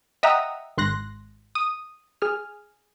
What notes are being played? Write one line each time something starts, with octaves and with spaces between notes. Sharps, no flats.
D#5 E5 F#5 G5 A#5 D#6
G#1 C6 F#6 A#6
D#6
G#4 F6